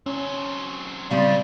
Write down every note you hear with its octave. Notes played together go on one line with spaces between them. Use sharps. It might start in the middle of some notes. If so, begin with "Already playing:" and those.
F#3 C4 C#4
F2 C#3 F3 G3 C4 D5